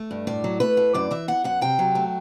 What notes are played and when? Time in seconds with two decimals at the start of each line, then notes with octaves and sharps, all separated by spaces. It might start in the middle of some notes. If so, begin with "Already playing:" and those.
Already playing: A3
0.11 G2
0.27 A2 D5
0.44 F#3
0.60 A3 B4
0.77 A2
0.94 F#2 D5
1.11 E3 E5
1.28 B3 F#5
1.44 F#2 F#5
1.61 C3 G5
1.79 F#3
1.95 A3